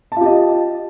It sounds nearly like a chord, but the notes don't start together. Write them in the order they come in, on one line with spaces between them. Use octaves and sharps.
A5 F4 G4 D#5